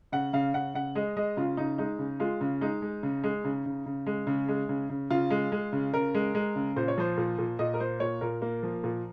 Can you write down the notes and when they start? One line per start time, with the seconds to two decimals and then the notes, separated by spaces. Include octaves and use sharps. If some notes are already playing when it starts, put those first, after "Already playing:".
0.12 C#3 F#5
0.33 C#3 F5
0.54 C#3 F#5
0.74 C#3 F#5
0.95 G#3 D#5
1.17 G#3 D#5
1.37 C#3 F4
1.57 C#3 D#4
1.78 G#3 D#4
1.99 C#3
2.20 G#3 F4
2.41 C#3
2.61 G#3 D#4
2.82 G#3
3.03 C#3
3.24 G#3
3.44 C#3
3.66 C#3
3.86 C#3
4.07 G#3
4.27 C#3
4.48 G#3
4.69 C#3
4.90 C#3
5.10 C#3 F4
5.31 G#3
5.52 G#3
5.73 C#3
5.94 C#3 A#4
6.15 G#3
6.35 G#3
6.56 C#3
6.76 A#2 C5
6.88 C#5
6.98 F3 C5
7.18 A#2
7.39 A#2
7.59 A#2 D#5
7.74 A#4
7.80 A#3 C5
8.00 A#2 C#5
8.21 A#2 A#4
8.42 A#3
8.63 F3
8.84 A#2